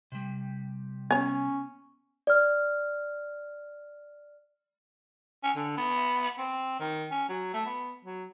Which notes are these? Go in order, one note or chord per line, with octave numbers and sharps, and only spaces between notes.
C3 G3
B3 C#4 C#5 G#5
D5 F6
C#4
D3
B3
C4
D#3
C#4
F#3
A3
B3
F#3